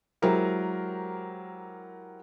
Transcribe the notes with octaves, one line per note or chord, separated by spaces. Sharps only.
F#3 G#3 E4 G4 A#4 C5